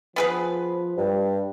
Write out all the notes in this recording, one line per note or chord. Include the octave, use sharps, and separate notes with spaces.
F3 B3 G#4 B4
G2 G3